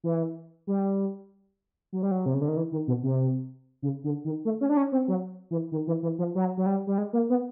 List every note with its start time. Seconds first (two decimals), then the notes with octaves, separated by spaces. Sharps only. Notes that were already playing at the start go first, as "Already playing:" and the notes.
0.04 E3
0.67 G3
1.93 F#3
2.03 G3
2.11 F#3
2.26 C3
2.34 C#3
2.41 D3
2.48 D#3
2.57 E3
2.72 D#3
2.87 B2
3.03 C3
3.82 C#3
4.04 D3
4.25 D#3
4.45 A3
4.61 C#4
4.69 D4
4.77 C#4
4.92 C4
5.08 F#3
5.51 E3
5.72 D#3
5.87 E3
6.03 E3
6.19 F3
6.35 F#3
6.57 F#3
6.66 G3
6.87 G3
6.98 G#3
7.13 A#3
7.30 B3